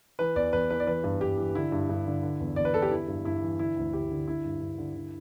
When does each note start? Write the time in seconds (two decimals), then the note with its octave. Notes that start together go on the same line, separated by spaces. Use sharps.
0.19 E3 B4
0.36 E2 D5
0.53 E2 B4
0.70 E3 B4
0.80 D5
0.87 E3 B4
1.04 G2
1.21 G2 G4
1.38 E3
1.55 D3 E4
1.72 G2
1.89 G2
2.07 D3
2.23 D3
2.40 E2
2.56 E2 D5
2.65 B4
2.74 D3 A4
2.82 G4
2.91 E3 E4
3.08 G2
3.25 G2 E4
3.42 E3
3.59 D3 E4
3.77 D2
3.93 D2 G4
4.11 D3
4.28 D3 E4
4.45 G2
4.61 G2
4.78 D3
4.95 D3